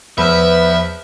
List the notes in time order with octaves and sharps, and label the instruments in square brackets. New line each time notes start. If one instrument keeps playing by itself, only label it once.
[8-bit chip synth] E2 F3 F6 [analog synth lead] B4 [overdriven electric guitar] E5